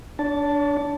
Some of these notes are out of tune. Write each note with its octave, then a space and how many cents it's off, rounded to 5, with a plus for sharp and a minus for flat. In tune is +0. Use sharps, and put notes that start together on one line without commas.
D4 -10 C#5 +40 A5 +0